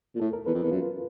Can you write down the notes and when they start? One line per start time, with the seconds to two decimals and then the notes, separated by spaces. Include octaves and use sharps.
0.15 A#2
0.20 A2 A4
0.33 A#4
0.46 E2 B4
0.54 F2
0.59 E2 B4
0.71 F#2 F4